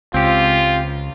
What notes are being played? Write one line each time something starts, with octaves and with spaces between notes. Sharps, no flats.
C#2 C4 F4 G4